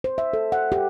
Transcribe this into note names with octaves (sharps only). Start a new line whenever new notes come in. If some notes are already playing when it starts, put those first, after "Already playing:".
C5
E5
A4
F#5
G4